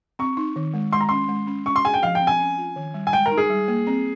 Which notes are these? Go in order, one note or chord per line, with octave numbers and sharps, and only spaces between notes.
C4 C#6
D#4
D#3
G#3
G#3 C6
A#5
C#4 C6
G#3
C#4
C#4 C#6
C6
G#4 G#5
G5
F3 F5
G5
C4
G#5
C#4
F4
D#3
G3
G#5
G#3 G5
A#4
D#4
G#4
G3
A#3
C4